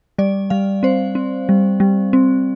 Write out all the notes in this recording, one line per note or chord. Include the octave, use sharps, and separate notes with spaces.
G3 D5
G3 F5
C4 C5
C4
G3
G3
C4